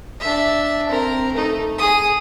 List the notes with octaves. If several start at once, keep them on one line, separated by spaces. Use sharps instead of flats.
D4 E5
C4 A#4
A3 D#4
G#4 D#6